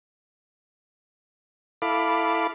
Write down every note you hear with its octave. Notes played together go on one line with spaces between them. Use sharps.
E4 A4 F5 B5 D6